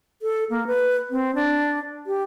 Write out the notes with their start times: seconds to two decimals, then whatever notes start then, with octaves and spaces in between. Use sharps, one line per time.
0.22 A4
0.50 A#3
0.67 B4
1.11 C4
1.35 D4
2.07 G4